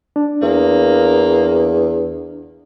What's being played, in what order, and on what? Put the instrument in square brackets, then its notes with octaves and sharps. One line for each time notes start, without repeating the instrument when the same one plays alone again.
[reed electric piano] D4
[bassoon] E2 [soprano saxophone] A#3